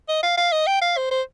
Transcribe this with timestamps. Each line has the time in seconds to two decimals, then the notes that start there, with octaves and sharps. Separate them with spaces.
0.08 D#5
0.23 F5
0.37 F5
0.52 D#5
0.67 G5
0.82 F5
0.97 C5
1.11 C5